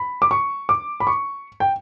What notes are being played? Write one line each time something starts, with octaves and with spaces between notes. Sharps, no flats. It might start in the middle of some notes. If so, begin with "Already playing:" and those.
Already playing: B5
D6
C#6
D6
B5
C#6
G5